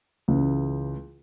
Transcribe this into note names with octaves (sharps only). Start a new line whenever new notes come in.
C#2 C#3 E3